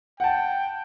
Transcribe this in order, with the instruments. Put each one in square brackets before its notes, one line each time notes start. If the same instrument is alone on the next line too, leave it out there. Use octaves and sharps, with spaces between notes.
[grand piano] F#5 A5 [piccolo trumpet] G5